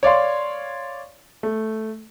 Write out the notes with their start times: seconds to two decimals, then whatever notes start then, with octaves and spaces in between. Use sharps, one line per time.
0.03 C#5 D5 F5 C6
1.43 A3